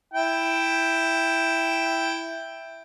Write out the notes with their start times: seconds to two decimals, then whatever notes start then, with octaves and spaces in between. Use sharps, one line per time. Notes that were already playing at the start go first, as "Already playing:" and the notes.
0.14 E4 G5